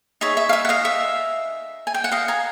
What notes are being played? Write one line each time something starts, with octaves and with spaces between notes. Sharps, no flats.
D#4 G#4 C#5 E5
E5
F5
E5
F#5
D#5 F5
E5
G#5
G5
F#5
D#5 F5
G#5 A#5